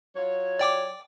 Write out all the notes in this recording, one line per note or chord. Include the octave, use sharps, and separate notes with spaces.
F#3 F4 C#5
D5 G5 D6